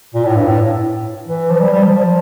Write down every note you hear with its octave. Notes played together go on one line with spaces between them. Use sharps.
A#2
A2
G2
A2
E3
F3
G3
G3
F3
F3